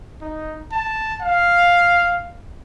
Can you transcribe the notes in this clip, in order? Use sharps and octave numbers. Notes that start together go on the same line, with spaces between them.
D#4
A5
F5